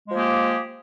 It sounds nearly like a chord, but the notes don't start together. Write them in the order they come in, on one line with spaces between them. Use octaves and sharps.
G#3 F3 G#4 A#3 G4